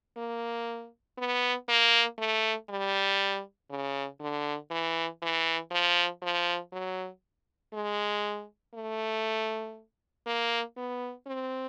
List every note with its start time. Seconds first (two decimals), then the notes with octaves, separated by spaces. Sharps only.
0.17 A#3
1.18 B3
1.68 A#3
2.18 A3
2.69 G3
3.70 C#3
4.20 D3
4.70 E3
5.22 E3
5.71 F3
6.22 F3
6.72 F#3
7.73 G#3
8.75 A3
10.26 A#3
10.77 B3
11.27 C4